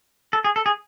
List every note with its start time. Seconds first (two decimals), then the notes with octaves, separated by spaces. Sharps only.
0.33 A4
0.44 G#4
0.56 A4
0.66 G#4